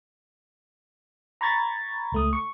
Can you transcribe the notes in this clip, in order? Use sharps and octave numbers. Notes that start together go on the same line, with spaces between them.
A#5 B5 C#6 G#6 A6
C#2 A3 D#6
C#6